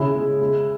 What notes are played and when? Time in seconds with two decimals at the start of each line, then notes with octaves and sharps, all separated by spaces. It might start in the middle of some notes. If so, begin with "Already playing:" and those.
Already playing: C#3 G#3 E4 G#4
0.15 G#3
0.41 G#3